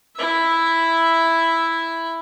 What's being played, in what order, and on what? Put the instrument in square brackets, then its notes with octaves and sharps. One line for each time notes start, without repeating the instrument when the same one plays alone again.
[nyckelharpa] E4 E5